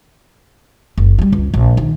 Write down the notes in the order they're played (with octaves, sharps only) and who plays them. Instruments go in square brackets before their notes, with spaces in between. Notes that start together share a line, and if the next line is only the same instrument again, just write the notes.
[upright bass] F#1
F#3 G3
C#2
A#1
D#3